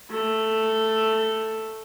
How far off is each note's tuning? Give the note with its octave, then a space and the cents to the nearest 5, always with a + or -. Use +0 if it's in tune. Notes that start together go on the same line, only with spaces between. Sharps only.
A3 +5